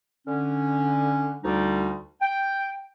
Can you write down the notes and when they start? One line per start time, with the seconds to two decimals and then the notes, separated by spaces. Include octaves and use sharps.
0.26 D3 C#4
1.43 D2 G3 D#4
2.21 G5